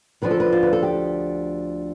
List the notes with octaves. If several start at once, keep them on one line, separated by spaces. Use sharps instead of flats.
D2 D3 F3 B4
A4
B4
F4
B4
A4
G4